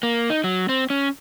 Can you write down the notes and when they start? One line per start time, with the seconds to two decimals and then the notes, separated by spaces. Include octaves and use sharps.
0.03 A#3
0.30 D#4
0.44 F#3
0.69 C4
0.90 C#4